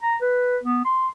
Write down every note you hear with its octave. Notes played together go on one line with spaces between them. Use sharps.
A#5
B4
B3
C6